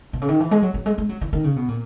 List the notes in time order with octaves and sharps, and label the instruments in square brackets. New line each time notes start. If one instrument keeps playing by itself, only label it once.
[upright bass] B2
C#3
D#3
E3
G#3
F#3
F#3
G#3
G#3
F#3
E3
D#3
C#3
B2
A#2